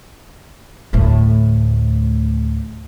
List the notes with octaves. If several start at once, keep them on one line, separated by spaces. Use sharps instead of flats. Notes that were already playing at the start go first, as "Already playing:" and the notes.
D2 A2